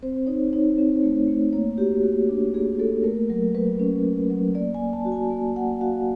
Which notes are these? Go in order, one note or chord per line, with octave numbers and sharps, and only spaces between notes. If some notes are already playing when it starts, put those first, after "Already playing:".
C4 C5
D#4 C#5
D#4 C#5
C4
A3
A3
A#3 C#5
F#4 G4
A#3 F#4
D4 G4
A#3 G#4
A#3 A4
A3 A#4
F#3 A#4
F#3 B4
C#4
F#3
F#3
A#3 D5
G#5
A#3
A5
F#4
G#5
A#3
A#3 F#5
F#4 F5